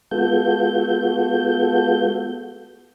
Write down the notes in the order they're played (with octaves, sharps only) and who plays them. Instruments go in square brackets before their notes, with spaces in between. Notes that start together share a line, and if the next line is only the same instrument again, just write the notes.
[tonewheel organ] G#3 B3 F4 F#4 A4 G6